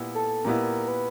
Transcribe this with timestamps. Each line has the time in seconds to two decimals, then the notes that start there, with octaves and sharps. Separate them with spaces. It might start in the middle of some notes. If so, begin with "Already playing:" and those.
Already playing: A#2 G3 B3 E4
0.15 A4
0.45 A#2 G3 B3 E4 A#4
0.88 B4